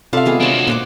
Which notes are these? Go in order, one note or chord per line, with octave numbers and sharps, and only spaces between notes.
C3 F4 A4 D5 E5 F5
G#3 B3 G#4
D4 F#4 C5 C#5 A#5
A#2 C5 F#5 D6